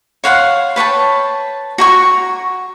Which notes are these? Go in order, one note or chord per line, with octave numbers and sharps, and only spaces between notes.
C#5 F5 F#5 C6
B4 C#5 G5 A5
F#4 A#5 C#6